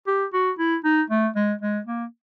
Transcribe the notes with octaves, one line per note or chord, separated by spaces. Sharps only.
G4
F#4
E4
D#4
A3
G#3
G#3
A#3